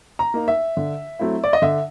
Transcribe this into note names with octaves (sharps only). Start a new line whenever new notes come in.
A#5
A#3 D#4
E5
D3
F#3 A3 C4 E4
D5
D#5
D3 E5